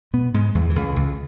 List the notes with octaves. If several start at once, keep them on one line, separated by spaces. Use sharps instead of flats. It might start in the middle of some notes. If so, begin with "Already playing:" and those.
B2 B3
G#2 G#3
E2 E3
E3
C#2 C#3
C#2 C#3